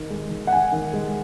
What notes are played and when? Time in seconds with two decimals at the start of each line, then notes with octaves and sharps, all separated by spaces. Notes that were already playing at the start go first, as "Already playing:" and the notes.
Already playing: D#3 D#4
0.10 G#3
0.30 D#3
0.47 F#5
0.52 D#4 G#5
0.72 D#3
0.93 G#3